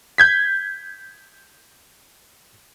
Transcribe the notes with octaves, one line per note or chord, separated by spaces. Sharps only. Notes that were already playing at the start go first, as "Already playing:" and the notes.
G6 G#6 B6